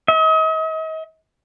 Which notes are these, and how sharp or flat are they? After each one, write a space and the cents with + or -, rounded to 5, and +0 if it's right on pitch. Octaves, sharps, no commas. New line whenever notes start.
D#5 +40